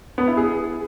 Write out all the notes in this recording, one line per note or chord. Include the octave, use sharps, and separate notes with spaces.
B3
E4
G#4